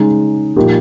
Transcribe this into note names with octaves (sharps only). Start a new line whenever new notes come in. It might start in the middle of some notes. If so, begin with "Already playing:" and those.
Already playing: C#3 G#3 D#4
A#2 F3 A#3 D#4 G4